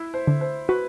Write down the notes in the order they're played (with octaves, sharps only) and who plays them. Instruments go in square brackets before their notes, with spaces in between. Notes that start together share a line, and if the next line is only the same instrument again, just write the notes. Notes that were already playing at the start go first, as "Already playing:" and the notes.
Already playing: [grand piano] E4 E5
C5
[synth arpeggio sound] D3
[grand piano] C5
[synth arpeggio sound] F#4 [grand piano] B4